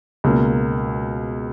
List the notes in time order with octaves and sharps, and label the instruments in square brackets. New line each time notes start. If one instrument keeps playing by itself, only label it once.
[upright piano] C#2 B2 A#3